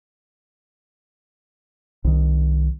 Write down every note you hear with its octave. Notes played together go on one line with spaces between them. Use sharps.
C2 D#3